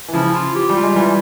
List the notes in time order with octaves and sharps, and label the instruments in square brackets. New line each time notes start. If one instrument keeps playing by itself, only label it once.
[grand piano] E3
[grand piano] C#3 F3 [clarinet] E4
[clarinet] F4
G4
[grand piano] G3
[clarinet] F4
[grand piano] G#3
[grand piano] E3 G3 [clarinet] F4